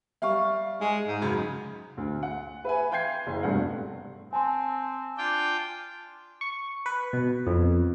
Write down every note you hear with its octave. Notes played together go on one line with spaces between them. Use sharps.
G3 E5 F5 C#6 F6
G#3
G#2
C#2 F#2 C#3
D2
F#5
B4 E5 G#5
F5 G5 C6 G6 G#6 C7
F#1
F1 G2 B2 A4 F#5
C4 G#5 A5 C6
D4 F4 G5
C#6
B4
B2
F2